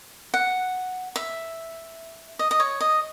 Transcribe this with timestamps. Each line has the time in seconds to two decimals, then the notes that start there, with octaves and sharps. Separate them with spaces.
0.34 F#5
1.16 E5
2.39 D#5
2.51 D#5
2.60 C#5
2.81 D#5